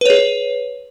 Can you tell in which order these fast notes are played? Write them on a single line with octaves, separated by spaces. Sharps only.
B4 C#5 G#4